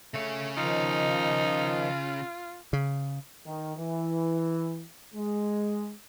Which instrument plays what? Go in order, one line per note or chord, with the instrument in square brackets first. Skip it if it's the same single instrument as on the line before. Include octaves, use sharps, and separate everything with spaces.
[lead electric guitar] C#3 C#5 [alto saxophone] A3
[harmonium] D#3 F3 [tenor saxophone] D#4 [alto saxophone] F4
[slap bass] C#3
[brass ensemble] D#3
E3
G#3